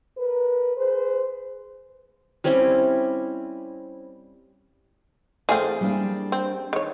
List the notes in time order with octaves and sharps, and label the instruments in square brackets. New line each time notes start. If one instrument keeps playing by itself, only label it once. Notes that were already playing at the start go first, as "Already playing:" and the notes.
[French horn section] A#4 B4
G#4 B4 C5
[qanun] G3 C4 C#4 E4
[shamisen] E3 A3 C4 [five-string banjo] G#4 F5 [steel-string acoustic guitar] A4
[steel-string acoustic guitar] G3 A#3 D4
[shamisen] C4
D#3 C#5